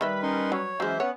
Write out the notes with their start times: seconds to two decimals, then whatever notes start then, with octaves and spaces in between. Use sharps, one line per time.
0.01 D#3 G3 B4 D#5 E5 B5
0.23 C#4 D#4 A#4 C6
0.52 F#3 C#5
0.80 E3 F#3 G#3 C#4 C5 E5
1.00 B3 C#4 C#5 F#5